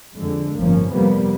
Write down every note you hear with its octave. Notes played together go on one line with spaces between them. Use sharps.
F2 D3 G#3
G1 A2 F3 A#3 C#4
F2 C3 G3 A#3 B3